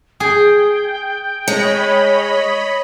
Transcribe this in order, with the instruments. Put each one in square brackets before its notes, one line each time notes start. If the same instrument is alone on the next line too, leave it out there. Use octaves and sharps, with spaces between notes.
[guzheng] G#4 [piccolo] G5
[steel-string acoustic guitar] G#3 [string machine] C#5 D#5 B5